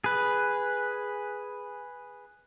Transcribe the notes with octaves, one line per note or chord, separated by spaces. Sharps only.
G#4 B4